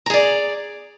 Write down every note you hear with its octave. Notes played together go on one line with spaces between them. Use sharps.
G#4 D5 A#5